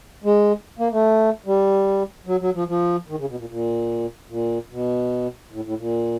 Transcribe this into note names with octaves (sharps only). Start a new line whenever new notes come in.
G#3
A#3
A3
G3
F#3
F#3
F3
F3
D#3
C#3
B2
A#2
A#2
A#2
B2
A2
A2
A#2